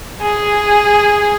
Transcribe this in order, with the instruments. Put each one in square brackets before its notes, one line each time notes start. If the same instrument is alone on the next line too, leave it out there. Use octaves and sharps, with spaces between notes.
[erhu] G#4